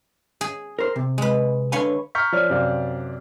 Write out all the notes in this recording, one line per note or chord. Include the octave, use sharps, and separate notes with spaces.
G#4
A#4 C5
C3
G#3 B4
D3 B4 C#5 F5 G#5 C6
A#5 C#6 F6 G6 B6
F3 C#5 D5 F6
F#2 C3 D5 F5